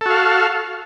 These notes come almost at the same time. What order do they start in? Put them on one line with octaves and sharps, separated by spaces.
A4 F#4 F5